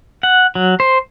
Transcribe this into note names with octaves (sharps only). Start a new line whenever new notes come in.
F#5
F#3
C5